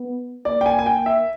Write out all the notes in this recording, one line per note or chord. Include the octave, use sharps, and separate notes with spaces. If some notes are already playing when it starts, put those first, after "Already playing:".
Already playing: B3
A#3 D5
G5
G#5
G#5
G5
E5